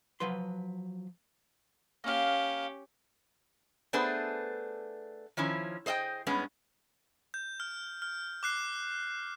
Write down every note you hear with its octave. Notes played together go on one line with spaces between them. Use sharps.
F3 F#3 B4 C6
A#3 C#4 G4 F5
A3 B3 D4 G#4 B4 C5
D#3 F3 C#4 E4
G#4 C5 D#5 F5 G5
G2 G#3 B3 C#4
G6
F6
F6
D6 F#6 C7